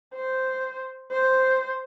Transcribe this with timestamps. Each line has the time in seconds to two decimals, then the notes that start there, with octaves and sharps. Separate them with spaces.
0.14 C5
1.11 C5